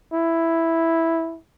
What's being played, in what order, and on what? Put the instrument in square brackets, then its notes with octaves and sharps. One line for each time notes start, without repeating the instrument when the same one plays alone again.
[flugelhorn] E4